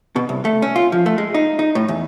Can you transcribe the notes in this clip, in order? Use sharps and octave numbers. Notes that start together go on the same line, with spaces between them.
B2
C2
A3
C#4
F4
F3
A3
G#3
D#4
D#4
A2
E2